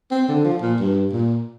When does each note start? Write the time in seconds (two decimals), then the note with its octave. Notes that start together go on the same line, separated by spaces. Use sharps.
0.11 C4
0.28 D3
0.44 F3
0.62 A#2
0.79 G2
1.12 A#2